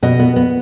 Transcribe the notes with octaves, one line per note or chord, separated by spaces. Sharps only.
B2 D#5
B3
B3